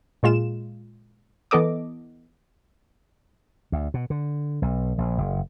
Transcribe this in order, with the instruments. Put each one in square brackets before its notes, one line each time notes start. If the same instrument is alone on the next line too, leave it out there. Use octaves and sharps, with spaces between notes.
[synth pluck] A#2 G#3 F4 E7
E3 B3 A4 D#5 D6
[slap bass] D2
B2
D3
B1
A#1
F#1